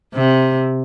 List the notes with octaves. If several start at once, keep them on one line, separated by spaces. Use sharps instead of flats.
C3